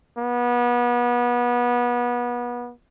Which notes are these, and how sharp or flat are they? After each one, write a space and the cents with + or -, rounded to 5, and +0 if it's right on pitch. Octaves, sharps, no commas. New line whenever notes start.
B3 -30